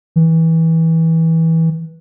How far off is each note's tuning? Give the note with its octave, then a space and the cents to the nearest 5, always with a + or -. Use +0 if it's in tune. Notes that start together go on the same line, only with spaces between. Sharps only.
E3 -20